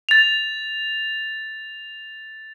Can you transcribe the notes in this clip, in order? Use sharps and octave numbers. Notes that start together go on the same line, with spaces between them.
A6 F7